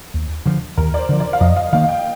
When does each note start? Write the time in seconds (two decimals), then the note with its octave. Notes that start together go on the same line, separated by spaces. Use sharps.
0.14 D#2
0.46 D3 F3
0.77 D#2 A#4
0.94 D5
0.98 C5
1.09 D3 F3
1.20 D5
1.33 F5
1.41 F2 D#5
1.56 F5
1.73 D#3 A#3 F5
1.84 F5
1.89 G5